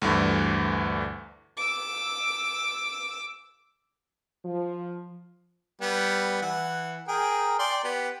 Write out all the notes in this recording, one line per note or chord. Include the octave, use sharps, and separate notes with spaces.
D2 G2 D3 E3
D6 E6
F3
G3 B3
E3 F#5
G#4 A#4 G5
D5 G5 C6
B3 G4